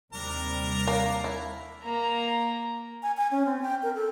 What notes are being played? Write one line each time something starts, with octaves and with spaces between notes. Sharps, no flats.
D#2 C3 G3 D4 A#4 A#5
A#3
E4
A#3 A#5
G#5
G#5
C#4
C4
G5
A#4
A4